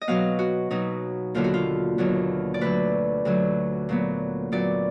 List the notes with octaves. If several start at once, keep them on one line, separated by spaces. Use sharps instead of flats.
D#5
B2 F#3 B3 F5
F#4
B2 F#3 B3 D#4
D#2 D3 F#3 B3 F4
F#4
F4
D#2 D3 F#3 B3
D5
D2 D3 F#3 B4
D2 D3 F#3
A#2 F#3 B3
A#2 F#3 B3 D5